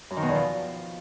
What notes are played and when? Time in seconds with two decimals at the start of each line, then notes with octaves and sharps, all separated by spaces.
0.10 F#2
0.16 D#3
0.22 B2
0.29 E2
0.35 F3